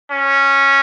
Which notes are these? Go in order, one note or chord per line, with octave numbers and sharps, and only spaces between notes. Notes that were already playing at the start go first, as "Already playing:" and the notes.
C#4